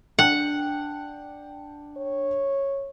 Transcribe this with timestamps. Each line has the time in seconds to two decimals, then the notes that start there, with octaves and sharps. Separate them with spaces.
0.19 D4 F#5 G5
1.97 C#5